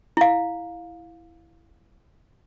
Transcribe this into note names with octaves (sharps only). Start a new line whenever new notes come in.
E4 F5